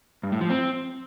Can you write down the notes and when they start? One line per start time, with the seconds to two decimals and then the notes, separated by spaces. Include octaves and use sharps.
0.23 G2
0.32 A2
0.41 F3
0.50 C4